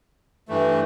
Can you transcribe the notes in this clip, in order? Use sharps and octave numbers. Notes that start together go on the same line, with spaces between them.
G2 E3 A3